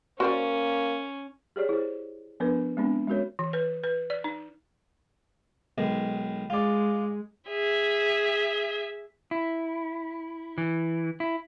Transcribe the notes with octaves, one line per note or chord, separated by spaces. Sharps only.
A#3 C#4 F#4 C5 D5
G4 G#4 C#5 D5
E4 G#4 C5
F3 B3 D4 A#4 B4
G#3 B3 C4 D4
G#3 C#4 F#4 A#4 C#5
E3
B4
B4
D5
D#4
B1 D#3 G#3
G#3 F4 D5
G#4 E5
E4
E3
E4